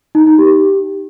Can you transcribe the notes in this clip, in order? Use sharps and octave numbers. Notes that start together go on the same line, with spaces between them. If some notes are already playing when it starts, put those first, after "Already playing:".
D#4
D#4
G4